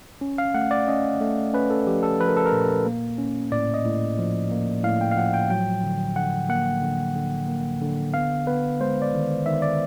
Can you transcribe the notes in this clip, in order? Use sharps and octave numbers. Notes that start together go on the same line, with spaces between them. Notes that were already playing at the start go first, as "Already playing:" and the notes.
C#4
F5
A3 F#5
D5
C#4 D#5
A3
C#4 B4
A4
F3 G4
A4
F3 B4
A#4
A4
A#4
A#2
A#3
C#4
A2 D5
D#5
A2
F3
A#3
A2 F5
G5
F5
F3 F#5
G5
F#3 G5
D3
D3 F#5
A#3 F#5
D3
D3
A#3
D3
B3 F5
B3 B4
G#3 C5
D5
D#3
D#3 E5
D5